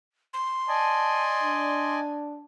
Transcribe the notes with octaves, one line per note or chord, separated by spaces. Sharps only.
C6
D5 D#5 G#5 A5
D4